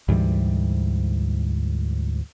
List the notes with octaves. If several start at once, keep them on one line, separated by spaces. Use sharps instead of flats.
D2 G#2 E3 G3